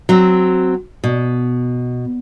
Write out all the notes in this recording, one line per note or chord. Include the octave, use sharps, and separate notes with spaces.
F#3 C4
B2